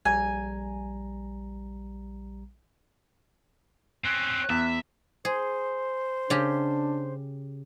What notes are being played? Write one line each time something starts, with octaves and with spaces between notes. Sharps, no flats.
A#1 G3 G#5 A#5
C4 C#4 F#6
E2 E5
G#4 C5
C#3 D4 G4